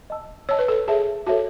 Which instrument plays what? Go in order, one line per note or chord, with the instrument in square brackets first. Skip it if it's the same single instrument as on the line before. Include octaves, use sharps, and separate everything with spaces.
[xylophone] D#5 A5 E6
[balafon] C#5 [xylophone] D#5 A5 E6
[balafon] B4
A4
[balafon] G#4 [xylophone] A4 C#5 E5 A5
[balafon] F#4 [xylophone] A4 C#5 E5 A5